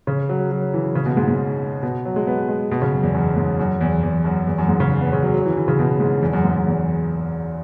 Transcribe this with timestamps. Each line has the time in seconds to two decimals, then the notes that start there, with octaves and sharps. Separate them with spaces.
0.07 C#3
0.29 F#3
0.51 F#3
0.74 E3
0.95 C#3
1.06 B2
1.17 G#2
1.27 G#2
1.83 B2
2.05 F#3
2.16 G#3
2.27 B3
2.48 G#3
2.71 B2
2.82 C#3
2.93 F#2
3.03 E2
3.14 F#2
3.36 G#2
3.59 F#2
3.81 E2
4.03 E2
4.25 F#2
4.47 E2
4.58 F#2
4.68 G#2
4.80 C#3
5.01 B3
5.13 C#3
5.23 F#3
5.34 F#3
5.46 E3
5.57 E3
5.68 C#3
5.79 B2
6.00 G#2
6.22 E2
6.33 F#2
6.44 G#2
6.55 F#2
6.67 E2